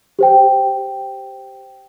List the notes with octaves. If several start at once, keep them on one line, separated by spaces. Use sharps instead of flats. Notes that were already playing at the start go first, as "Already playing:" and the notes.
G4 C5 G5